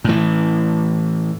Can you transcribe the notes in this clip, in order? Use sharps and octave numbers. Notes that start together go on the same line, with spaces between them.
A2 E3